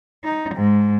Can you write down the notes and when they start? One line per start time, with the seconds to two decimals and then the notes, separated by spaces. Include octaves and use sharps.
0.24 D#4
0.54 G#2